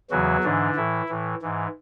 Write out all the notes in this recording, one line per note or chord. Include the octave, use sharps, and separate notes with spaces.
E2 C#3 E3 F#3 F#4
G#2 D3 E3 D4
A2 E3 E4
A2 E3
G#2 E3